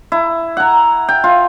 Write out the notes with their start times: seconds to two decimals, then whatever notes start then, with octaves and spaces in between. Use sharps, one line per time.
0.12 E4
0.57 F#5 A#5
1.09 G5
1.24 F4